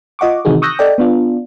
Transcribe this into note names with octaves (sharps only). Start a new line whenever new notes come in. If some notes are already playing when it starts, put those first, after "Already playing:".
F4 D#5 F#5 C#6 D6
C3 D#3 E3 D#4 F#4 G#4
C#6 D#6 E6 F#6 G6 A#6
A4 D5 D#5 G5
B3 D4 F4